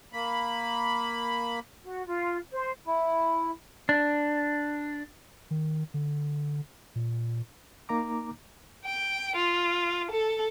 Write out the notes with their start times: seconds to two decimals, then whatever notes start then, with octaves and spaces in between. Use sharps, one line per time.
0.13 A#3 B5
1.84 F#4
2.06 F4
2.53 C5
2.87 E4
3.89 D4
5.51 D#3
5.94 D3
6.96 A#2
7.89 A#3 D#4 A#5 D6
8.85 G5
9.36 F4
10.12 A4